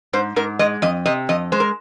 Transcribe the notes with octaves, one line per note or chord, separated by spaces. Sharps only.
G#2 C5
G#2 A#4
G#3 D#5
F2 D#5
C3 D#5
F2 D#5
G#3 C5
A#4